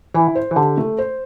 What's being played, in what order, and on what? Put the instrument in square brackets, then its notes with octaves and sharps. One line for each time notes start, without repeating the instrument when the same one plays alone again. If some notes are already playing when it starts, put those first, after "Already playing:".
[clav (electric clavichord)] E3 [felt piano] E4
[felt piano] C5
[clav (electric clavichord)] E3
[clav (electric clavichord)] D3 [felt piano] G4
[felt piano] A3
C5